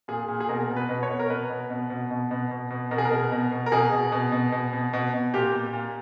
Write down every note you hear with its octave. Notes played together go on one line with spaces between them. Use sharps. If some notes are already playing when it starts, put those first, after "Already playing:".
A#2 G#4
A#2
G#4
B2 A#4
B2
B4
B2
C#5
B2
A#4
B2 B4
B2
B2
B2
B2
B2
B2
B2
B2 A#4
G#4
A#4
B2
B2
B2
A#4
B2 G#4
B2
B2
B2
B2
B2
B2
B2
A#2 G4
A#2
A#2